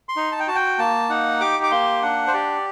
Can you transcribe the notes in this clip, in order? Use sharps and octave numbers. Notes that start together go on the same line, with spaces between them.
C6
D#4
A5
G5
F#4 A5
G5
A#3 A5
D#4 F#5
G4 D6
D6
A#3 C6
D4 F#5
C5
G4 D5